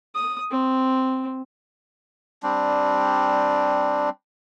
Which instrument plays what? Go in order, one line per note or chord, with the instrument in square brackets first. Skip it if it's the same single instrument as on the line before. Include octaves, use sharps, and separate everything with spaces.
[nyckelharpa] D#6
C4
[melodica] G3 C4 D4